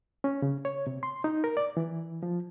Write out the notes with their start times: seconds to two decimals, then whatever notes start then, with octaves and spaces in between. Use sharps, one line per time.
0.24 C#4
0.42 C#3
0.65 C#5
0.87 C3
1.03 C6
1.24 D#4
1.44 A#4
1.57 D5
1.77 E3
2.23 F3